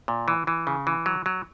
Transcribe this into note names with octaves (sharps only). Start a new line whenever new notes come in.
A#2
E3
E3
C#3
E3
F#3
F#3